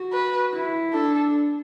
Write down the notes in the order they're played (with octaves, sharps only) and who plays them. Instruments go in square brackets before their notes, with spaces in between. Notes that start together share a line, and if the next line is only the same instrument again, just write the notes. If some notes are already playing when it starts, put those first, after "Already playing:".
Already playing: [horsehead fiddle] F#4
[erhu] B4
[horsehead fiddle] E4
[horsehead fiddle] D4 [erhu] A4